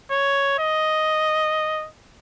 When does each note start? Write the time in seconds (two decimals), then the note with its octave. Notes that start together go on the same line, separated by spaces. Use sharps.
0.11 C#5
0.59 D#5